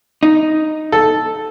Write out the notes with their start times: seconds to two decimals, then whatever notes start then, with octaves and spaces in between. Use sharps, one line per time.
0.23 D#4
0.92 A4